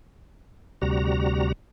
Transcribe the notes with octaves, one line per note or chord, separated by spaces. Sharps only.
D2 C3 G3 F#4 A#5